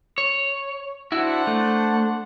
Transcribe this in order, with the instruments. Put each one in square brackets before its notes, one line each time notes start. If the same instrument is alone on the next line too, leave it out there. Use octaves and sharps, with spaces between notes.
[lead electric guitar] C#5
[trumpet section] D4 C5 F#5 [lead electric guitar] E4 F#4
[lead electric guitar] A3